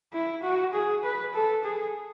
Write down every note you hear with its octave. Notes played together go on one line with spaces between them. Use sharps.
E4
F#4
G#4
B4
A4
G#4